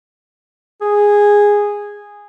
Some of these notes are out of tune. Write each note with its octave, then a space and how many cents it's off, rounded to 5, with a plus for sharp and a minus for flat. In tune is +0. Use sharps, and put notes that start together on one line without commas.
G#4 -10